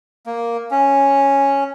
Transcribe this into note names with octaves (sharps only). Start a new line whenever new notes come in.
A#3
C#4